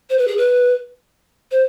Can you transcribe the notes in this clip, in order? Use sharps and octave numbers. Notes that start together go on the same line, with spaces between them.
C5
B4
G#4
B4
C5